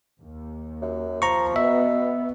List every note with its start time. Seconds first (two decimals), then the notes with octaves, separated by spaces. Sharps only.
0.23 D#2
0.82 F#2
1.22 F3 A#5 C#6
1.56 B2 B3 E5